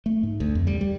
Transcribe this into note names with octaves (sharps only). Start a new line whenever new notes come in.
A3
G#2
D2
F2
G3
G3